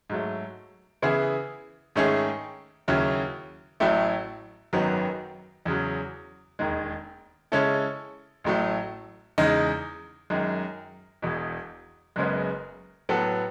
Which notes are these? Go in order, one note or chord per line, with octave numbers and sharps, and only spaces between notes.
G#2 F#3 A3
C#3 E3 B3 E4 G#4
G#2 D#3 A3 C#4 G#4
D#2 C#3 F#3 C#4 E4
A1 A2 F#3 A3 E4
G#1 F#2 D#3 F#3 B3
E2 C#3 F#3
E1 D#2 D#3 G#3
C#3 G#3 C#4 E4 A4
A1 A2 F#3 A3
E2 C#3 G#3 D#4
F#2 D#3 G#3
E1 E2 B2
F#1 F#2 C#3 G#3 B3
A2 F#3 B3 F#4 A4